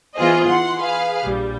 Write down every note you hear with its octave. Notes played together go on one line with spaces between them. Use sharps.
E3 B3 F4 G#4 C5 D#5
E3 F#5 C6
G#4 B4 F5
A#1 G3